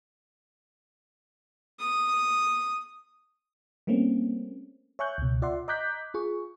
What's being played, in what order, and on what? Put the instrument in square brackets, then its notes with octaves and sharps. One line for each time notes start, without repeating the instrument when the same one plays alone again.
[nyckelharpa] D#6
[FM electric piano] G3 A3 A#3 C4 C#4
C#5 E5 G#5 C#6 F#6 G6
C#2 B2
F4 D5 E5 F#5 C6
D#5 A#5 D6 F#6 G6 B6
F4 G#4 C#6